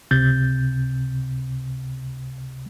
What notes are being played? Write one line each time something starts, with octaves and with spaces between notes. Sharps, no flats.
C#2 C3 G6 A6